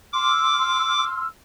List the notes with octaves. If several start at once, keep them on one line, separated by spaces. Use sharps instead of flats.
C6 D6 E6 F6